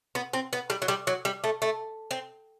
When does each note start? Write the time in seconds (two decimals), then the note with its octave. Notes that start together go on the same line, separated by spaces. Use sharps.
0.15 B3
0.33 C4
0.53 B3
0.70 G3
0.82 F#3
0.88 G3
1.07 F#3
1.25 G3
1.44 A3
1.62 A3
2.11 C4